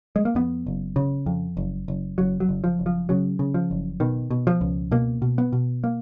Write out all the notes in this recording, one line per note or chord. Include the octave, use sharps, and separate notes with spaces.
G#3
A#3
F2 B3
F#1
C#3
F2
F#1
F#1
F#1 F#3
F#3
F#1
F3
F#1
F3
C#3 F#3
C#3
F3
F#1
B2 D#3
B2
F3
C#2
B2 A#3
B2
B3
B2
A#3